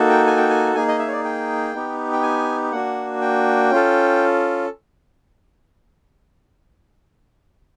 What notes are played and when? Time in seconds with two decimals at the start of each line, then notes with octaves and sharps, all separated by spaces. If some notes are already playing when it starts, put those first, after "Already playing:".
Already playing: A#3 D#4 F#4 A4
0.09 G5
0.26 G#5
0.37 G5
0.49 G#5
0.75 A#3 D#4 G#4 G#5
0.88 D#5
0.99 E5
1.08 C#5
1.12 D5
1.24 G5
1.74 B3 D#4 G4
2.13 G5
2.23 G#5
2.72 A#3 D4 F#4 F#5
3.21 G5
3.70 C#4 F4 A4